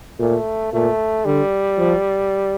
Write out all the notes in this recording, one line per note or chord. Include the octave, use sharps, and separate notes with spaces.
A#2 A3
A#2 A3
D3 G3
F3